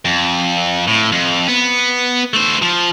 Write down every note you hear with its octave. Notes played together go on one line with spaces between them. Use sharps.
F2
A2
F2
B3
A3 C5
F3